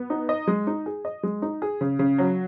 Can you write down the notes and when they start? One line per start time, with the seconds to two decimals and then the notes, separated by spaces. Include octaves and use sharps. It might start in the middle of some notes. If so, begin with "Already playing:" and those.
Already playing: B3
0.10 D#4
0.29 D#5
0.48 G#3
0.67 D#4
0.86 G#4
1.05 D#5
1.23 G#3
1.42 D#4
1.62 G#4
1.81 C#3
1.99 C#3
2.18 F#3